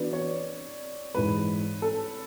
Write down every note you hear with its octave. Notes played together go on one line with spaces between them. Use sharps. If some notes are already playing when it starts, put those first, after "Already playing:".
Already playing: E3 B3 D4 F#4 B4 D5
C#5
G#2 E3 G#3 B4
A4